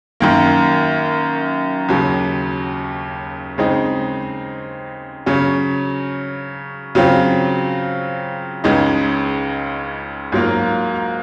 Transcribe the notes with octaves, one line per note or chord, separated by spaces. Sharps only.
F#2 D#3 A#3
D#2 C#3 F#3
C#3 G#3 C4 D#4
C#3 F#3 C#4
C#3 F#3 C4 F4
C#2 C#3 G#3 D#4
G#2 F#3 A#3 F4